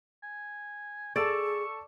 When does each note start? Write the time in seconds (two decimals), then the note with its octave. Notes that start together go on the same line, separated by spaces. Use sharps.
0.23 G#5
1.16 G#4 A4 D5 C#6 E6 A6